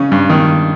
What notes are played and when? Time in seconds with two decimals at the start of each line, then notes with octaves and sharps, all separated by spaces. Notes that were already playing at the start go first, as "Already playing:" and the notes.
Already playing: C#3 C#4
0.12 G2
0.29 D#3